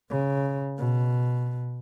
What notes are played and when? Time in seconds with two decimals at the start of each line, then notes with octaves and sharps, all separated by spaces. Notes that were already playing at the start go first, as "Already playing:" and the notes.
0.10 C#3
0.78 B2